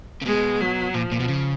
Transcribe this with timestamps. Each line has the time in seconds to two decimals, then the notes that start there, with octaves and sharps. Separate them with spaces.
0.22 C#3
0.26 B2 G#3
0.61 F#3
0.94 A#2 F3
1.12 A#2
1.20 B2
1.28 C#3